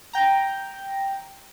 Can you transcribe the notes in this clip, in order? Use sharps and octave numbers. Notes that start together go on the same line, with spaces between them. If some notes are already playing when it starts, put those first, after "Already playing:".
G5 A#5